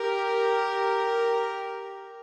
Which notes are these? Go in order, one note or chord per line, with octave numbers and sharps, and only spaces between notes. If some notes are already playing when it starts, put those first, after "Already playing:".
Already playing: G4 A#4